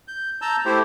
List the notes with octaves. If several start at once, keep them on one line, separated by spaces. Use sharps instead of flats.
G6
A5 A#5 E6 G6
A3 E4 G4 C5